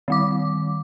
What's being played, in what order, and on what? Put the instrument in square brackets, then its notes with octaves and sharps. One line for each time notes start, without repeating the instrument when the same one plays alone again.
[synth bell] D#3 G3 D6